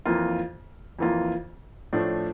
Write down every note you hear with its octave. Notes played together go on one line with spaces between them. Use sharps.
F2 E3 A#3 F4
F2 E3 A#3 F4
A2 F3 A3 D4